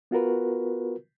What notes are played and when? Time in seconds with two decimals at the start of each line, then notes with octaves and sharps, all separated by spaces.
0.11 B3 F4 F#4 A#4 B4